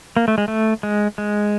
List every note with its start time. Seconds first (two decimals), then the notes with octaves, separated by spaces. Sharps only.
0.17 A#3
0.28 A3
0.38 G#3
0.48 A3
0.83 G#3
1.18 G#3